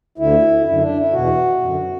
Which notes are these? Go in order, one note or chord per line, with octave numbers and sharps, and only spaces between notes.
D2 D3 E4
F#2 D3 E4
D4
E4
E2 B2 F#4
F#2 D3